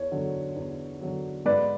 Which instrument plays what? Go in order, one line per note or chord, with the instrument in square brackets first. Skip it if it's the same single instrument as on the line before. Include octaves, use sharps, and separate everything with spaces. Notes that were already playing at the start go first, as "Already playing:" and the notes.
Already playing: [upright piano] E2 C#5
D3 F#3
E2
D3 F#3
G#2 B4 D5